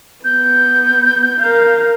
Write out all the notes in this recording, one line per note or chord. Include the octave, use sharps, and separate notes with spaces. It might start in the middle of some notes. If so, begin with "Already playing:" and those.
B3 G6
A#4 F5